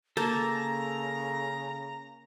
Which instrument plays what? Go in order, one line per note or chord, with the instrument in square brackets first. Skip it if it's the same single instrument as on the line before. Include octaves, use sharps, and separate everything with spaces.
[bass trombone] C#3 [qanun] A#3 [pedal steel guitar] A4 A5 [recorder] A#5